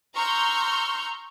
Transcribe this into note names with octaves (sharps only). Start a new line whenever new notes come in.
A#5 C6 C#6 E6 F6 G6